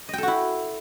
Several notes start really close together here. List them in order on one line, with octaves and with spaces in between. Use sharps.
D#5 G5 A4 F#4 E4